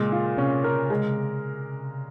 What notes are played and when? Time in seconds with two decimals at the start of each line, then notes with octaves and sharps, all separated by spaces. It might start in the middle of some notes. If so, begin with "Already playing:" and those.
Already playing: A#2 C#3 G#3
0.12 F4
0.37 C3 C#4
0.64 A#4
0.90 G#3